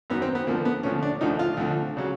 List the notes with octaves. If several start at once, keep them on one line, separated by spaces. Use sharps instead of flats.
F#2 D#3 F#3 B3
C4
B3
D2 D3 F3 A#3
B3
D2 D3 F3 C#4
D4
D2 D3 F3 D#4
F4
D2 D3 F3
C#3 F#3